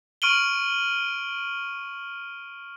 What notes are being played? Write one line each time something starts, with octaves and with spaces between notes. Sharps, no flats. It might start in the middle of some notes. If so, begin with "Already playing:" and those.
C#6 F6 D7 D#7 F#7 G7